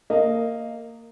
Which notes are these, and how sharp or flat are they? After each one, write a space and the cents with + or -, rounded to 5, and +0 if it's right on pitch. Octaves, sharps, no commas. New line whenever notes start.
A#3 -15 D#5 +0